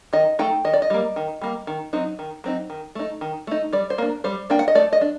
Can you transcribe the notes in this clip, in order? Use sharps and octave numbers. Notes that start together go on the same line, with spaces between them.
D#3 D#5
A3 D#4 G5
D#3 D#5
D5
D#5
G3 A#3
D#3
G3 A#3
D#3
F#3 C4 D#4
D#3
F#3 C4 D#4
D#3
A3 D#4
D#3
A3 D#4
G3 D5
C5
A#3 D4
G3 C5
A#3 D4 G5
F#5
D#5
A3 D5
D#5
D4